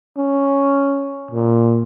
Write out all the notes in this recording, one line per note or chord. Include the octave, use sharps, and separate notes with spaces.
C#4
A#2